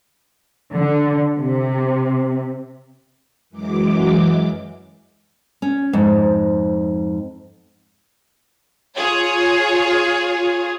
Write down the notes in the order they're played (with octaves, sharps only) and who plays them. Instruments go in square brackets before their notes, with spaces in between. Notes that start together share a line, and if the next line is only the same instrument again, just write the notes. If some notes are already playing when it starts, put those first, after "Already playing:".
[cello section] D3
C3
[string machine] F#2 E3 F#3 G#3 D6
[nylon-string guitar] C#4
F2 G#2
[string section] F4 G#4 C#5